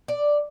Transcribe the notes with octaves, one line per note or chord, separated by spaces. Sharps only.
D5